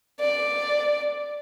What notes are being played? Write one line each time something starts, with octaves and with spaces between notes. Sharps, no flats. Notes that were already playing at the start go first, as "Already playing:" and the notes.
D5